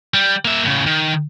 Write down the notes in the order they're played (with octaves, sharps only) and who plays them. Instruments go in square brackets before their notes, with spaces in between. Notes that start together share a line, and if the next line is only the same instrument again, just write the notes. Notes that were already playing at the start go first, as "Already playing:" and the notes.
[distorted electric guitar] G3
A#3 E5
A2 C#3
D#3